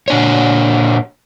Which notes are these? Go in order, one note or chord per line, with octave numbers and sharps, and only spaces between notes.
A#2 D4 C#5